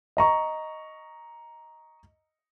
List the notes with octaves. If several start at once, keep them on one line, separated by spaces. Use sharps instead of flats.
D#5 A#5 C#6